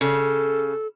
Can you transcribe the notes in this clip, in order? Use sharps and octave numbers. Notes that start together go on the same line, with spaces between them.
C#3 A4